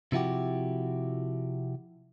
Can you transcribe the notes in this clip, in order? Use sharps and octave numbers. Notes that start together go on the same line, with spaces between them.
C3 F3 E4 F#4 G4